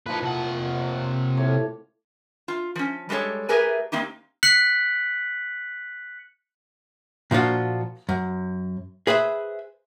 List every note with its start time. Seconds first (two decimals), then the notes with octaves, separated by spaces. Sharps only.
0.06 A#2 F3 D#4 B4
0.23 C3 F#5
0.41 C#5
1.37 A2 C#5 D5
2.48 F4
2.75 F3 C#4
3.09 G3 G#3 G4 A4 C#5
3.49 A3 G4 G#4 A#4 B4 G#5
3.92 A#3 C4 D#4 G4
4.43 F#6 B6 C#7 F#7
7.31 A#2 F3 D4 F4 F#4
8.09 F#2
9.07 G#4 B4 C5 E5